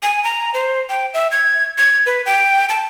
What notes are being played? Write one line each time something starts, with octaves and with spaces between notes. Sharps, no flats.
G#5
A#5
C5
G5
E5
G#6
G#6
B4
G5
A5